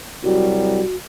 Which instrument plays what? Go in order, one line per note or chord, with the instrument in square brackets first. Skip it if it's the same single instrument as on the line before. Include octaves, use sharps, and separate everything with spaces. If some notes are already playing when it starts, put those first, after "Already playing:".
[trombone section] C2 F#3 G3 [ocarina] F#4